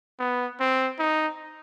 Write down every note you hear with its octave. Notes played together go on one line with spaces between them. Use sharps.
B3
C4
D#4